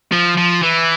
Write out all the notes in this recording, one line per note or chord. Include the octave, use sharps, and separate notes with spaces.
F3
F3
E3